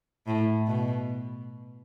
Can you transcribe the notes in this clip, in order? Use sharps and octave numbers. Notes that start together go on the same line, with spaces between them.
A2
B2